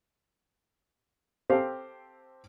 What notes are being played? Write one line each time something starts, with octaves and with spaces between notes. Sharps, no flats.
C4 G4 A4 C5 F5